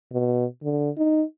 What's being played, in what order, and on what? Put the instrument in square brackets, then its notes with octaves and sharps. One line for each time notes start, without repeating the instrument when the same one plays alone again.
[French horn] B2
D3
D#4